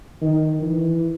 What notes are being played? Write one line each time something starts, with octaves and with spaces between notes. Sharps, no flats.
D#3
E3